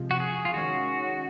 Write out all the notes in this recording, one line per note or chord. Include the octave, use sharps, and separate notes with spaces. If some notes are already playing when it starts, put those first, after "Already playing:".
Already playing: C3 F3 G#3
F#4
G#4
F4
D#3 G#3 C#4 F#4